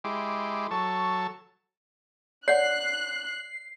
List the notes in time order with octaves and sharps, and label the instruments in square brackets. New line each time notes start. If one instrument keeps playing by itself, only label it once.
[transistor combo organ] G#3 E4 G4 C6 D6
F#3 A4 A5 C#6
[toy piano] C#5 D5 F#5 [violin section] F#6 [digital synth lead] C7